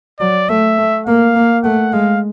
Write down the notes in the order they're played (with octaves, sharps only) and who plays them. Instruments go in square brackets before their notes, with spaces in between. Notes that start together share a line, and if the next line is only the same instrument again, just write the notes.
[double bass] F#3 [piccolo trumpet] D5
[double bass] A3 [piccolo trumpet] E5
[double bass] A3
[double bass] A#3 [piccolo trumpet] F5
[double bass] A#3
[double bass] A3 [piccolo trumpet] F#5
[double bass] G#3 [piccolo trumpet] F5